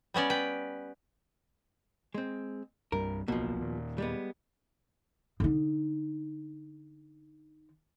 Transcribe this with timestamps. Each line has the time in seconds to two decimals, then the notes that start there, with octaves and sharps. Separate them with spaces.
0.14 G3 B3 C#4 D5
0.30 B4 G5
2.14 G#3 C4
2.92 C2 G2 G3 A#4
3.28 D1 B1 B2 F3 A#3
3.60 D#2 A#2
3.98 G3 G#3 B3
5.40 D3 D#4